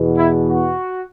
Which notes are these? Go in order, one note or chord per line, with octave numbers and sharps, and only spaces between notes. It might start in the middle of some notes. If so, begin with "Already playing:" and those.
Already playing: E2 B2
E4
F#4